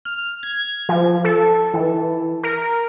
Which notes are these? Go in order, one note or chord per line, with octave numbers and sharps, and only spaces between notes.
F6
G#6
F3
A4
E3
A#4